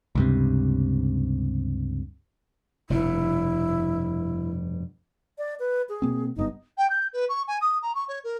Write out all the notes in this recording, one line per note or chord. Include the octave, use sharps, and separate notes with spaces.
C#2 G2 C3
F1 G2 B2 E4
D5
B4
G#4
B2 A#3 C4
F#1 G2 B3 D#4
G5
G6
B4
C#6
G#5
D#6
A#5
C#6
C#5
A#4